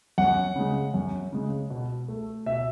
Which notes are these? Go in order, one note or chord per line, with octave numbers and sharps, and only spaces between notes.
F#2 F#5
C#3 G#3
F#2
C#3 G#3
B2
A3
B2 E5